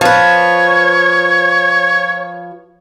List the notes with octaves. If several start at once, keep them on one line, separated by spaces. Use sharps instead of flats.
F3 B4 C#5